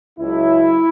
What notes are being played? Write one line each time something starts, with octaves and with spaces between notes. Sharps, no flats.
C#2 C#3 F#3 E4